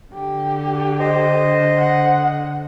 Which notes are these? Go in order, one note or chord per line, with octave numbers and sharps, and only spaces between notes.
D3 G4
C5 D#5
F#5